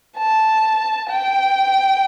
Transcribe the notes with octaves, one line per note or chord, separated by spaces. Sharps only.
A5
G5